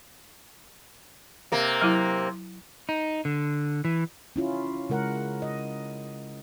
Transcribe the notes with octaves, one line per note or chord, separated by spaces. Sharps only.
C3 A#3
F#3 E4
D#4
D3
E3
C#4 E4 F4
C#3 G#3 A#4 F#5
D#5